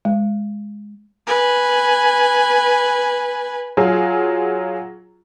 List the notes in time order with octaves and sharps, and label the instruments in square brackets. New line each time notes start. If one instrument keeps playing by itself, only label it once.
[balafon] G#3
[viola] B4 G#5
[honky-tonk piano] F#3 F4 G#4